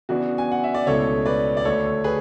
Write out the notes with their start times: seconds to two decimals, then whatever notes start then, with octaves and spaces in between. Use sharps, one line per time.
0.09 C#3 E3 B3 D4 F#4
0.38 G#5
0.52 F#5
0.64 E5
0.74 D5
0.87 C#2 B2 A3 E4 A4 C#5
1.26 B4 D5
1.57 D5
1.65 D2 D3 A3 A4 C#5
2.04 G#4 B4